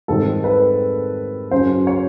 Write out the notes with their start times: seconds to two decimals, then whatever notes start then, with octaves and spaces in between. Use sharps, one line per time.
0.08 G#2 D#3 G3 C4 A4
0.44 B4
1.51 F#2 C#3 F#3 C5
1.87 C#5